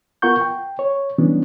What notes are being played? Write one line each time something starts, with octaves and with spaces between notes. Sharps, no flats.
B3 F4 A#4 F#5 C#6 G6
G5
C#5
E3 F#3 G3 B3 C#4 D4